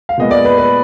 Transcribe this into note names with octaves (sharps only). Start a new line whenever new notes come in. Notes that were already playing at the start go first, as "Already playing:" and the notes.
F5
A#2 G#3 B3 D#5
D5
B4
B4